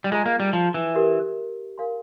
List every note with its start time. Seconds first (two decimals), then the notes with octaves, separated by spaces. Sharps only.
0.04 G3
0.11 G#3 F4 G#4 E5 A#5
0.26 A#3
0.40 G3
0.53 F3
0.74 E3
0.95 G4 A#4 E5
1.78 A#4 F5 G#5 C6